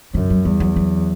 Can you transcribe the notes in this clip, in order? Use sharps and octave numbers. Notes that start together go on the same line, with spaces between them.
F#2 D3
F#3
E2 G3
F#3
F#3